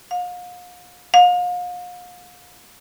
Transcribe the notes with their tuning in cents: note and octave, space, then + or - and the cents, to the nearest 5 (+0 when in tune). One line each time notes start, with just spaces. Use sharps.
F5 +40
F5 +40